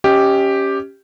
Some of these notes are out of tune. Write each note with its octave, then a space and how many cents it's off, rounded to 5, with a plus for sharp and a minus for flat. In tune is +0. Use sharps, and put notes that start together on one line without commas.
C#4 +0 G4 +0 D#5 +25